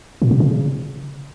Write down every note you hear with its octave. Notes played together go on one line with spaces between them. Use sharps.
A#2
B2
C#3